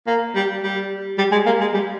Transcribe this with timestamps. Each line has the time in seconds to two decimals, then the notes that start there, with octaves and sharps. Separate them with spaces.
0.07 A#3
0.35 G3
0.63 G3
1.18 G3
1.32 G#3
1.46 A#3
1.61 G#3
1.74 G3